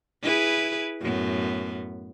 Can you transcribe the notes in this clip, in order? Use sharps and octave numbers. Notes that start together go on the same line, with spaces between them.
E4 G#4 B4
F#2 A2 B3